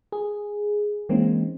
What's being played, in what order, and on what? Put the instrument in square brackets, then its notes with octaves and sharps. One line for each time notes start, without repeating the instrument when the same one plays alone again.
[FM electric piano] G#4
E3 G#3 A#3 C4 C#4 D#4